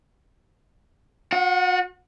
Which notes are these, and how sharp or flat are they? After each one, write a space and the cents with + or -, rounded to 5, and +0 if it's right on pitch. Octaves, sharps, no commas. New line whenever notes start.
F#4 -45 F#5 +0